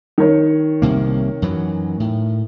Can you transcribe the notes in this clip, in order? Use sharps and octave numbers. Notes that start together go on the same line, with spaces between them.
D#3 C#5
C2 C3 A#3
F#2 E3 F#3
A2